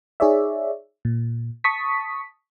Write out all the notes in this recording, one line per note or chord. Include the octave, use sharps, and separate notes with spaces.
D#4 G#4 C#5 D5 E5
A#2
A5 C#6 D#6 B6